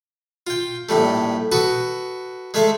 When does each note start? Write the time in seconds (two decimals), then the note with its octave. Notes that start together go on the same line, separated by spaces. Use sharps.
0.47 F4 G5
0.89 A#1 A2 G3 A3
1.52 F#4 A4 B4 D#6
2.54 G#3 A3 A4 E5 F5